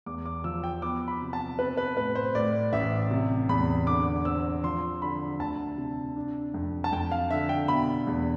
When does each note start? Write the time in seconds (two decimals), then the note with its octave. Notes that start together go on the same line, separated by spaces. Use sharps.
0.06 E2 D6
0.26 D6
0.44 F3 E6
0.64 G5
0.82 B3 D6
1.08 B5
1.21 C3
1.33 A5
1.59 C4 B4
1.77 B4
1.97 A2 B4
2.15 C5
2.35 A2 D5
2.73 A1 E5
3.11 C3
3.49 E2 B5
3.87 D3 D6
4.25 C4 E6
4.63 F3 C6
5.02 D3 B5
5.39 D2 A5
5.77 C3
6.16 D4
6.54 F2
6.84 A5
6.92 F2 G5
7.11 F5
7.30 D3 E5
7.49 G5
7.68 B2 B5
8.07 E2